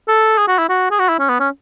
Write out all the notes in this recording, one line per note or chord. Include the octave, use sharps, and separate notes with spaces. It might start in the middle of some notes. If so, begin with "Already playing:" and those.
A4
G#4
F#4
E4
F#4
G#4
F#4
E4
C#4
B3
C#4